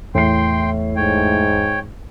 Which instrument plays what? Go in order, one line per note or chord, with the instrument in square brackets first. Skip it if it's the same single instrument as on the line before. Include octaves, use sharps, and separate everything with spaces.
[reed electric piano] E2 [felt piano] A2 C7 [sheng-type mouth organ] G5 C6
[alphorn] G#2 [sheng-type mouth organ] C#5 G5